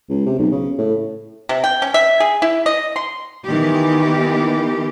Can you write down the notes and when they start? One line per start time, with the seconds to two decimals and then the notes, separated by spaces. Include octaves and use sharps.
0.09 C#2
0.26 C3
0.38 B1
0.52 C#3
0.78 A2
1.49 C3
1.64 G5
1.82 C#4
1.94 E5
2.20 G#4
2.42 E4
2.66 D#5
2.96 C6
3.45 D#3 E3 B3 G4